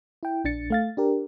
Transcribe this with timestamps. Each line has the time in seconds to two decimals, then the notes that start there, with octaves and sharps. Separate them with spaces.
0.23 E4 G5
0.44 A#1 D4 A6 C#7
0.70 A3 F5 A6
0.97 D4 G4 A#4